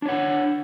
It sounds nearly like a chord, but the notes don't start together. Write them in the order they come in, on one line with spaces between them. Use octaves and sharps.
D4 C#5 F#5